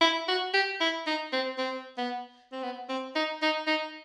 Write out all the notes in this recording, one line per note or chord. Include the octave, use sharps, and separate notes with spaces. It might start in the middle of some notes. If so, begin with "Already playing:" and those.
E4
F#4
G4
E4
D#4
C4
C4
B3
C4
B3
C4
D#4
D#4
D#4